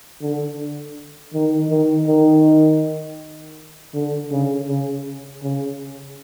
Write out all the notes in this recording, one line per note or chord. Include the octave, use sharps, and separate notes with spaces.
D3
D#3
D#3
D#3
D3
C#3
C#3
C#3